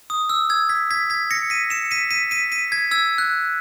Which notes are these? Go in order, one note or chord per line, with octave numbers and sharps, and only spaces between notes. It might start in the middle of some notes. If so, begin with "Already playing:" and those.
D#6
E6
E6 G#6
G#6 B6
G#6 B6
G#6 B6
A#6 C#7
B6 D#7
C#7 E7
B6 D#7
B6 D#7
B6 D#7
B6 D#7
G#6 B6
E6 G#6
F#6